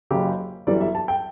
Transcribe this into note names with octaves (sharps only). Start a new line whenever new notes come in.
F#1 F#2 C#3 G4
G1 F#2 E3 G3 D5
E5
A5
G5